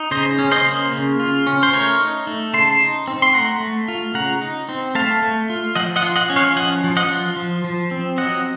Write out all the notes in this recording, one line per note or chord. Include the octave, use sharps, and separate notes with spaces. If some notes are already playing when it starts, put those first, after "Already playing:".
Already playing: D#4
C#3 C5 D#5
C#4
C5 D#5
A#3
C#3
F4
C#4
C5
A3 A#4 C#5
D#4
A3
C#3 A5 C6
D#4
C4
C6
A3 F#5 A#5
A3
F4
C#3 F#5 A#5
D#4
C4
A3 F5 A5
A3
F4
F3 D#5 F#5
D#5 F#5
F4
D#5 F#5
C#4
C#5 F5
F3 D#5 F#5
F3
D#5 F#5
F4
F3
F3
C4
F#3 D#5 F#5